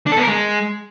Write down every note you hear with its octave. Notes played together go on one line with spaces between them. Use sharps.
D4
A4
B3
A#4
G#3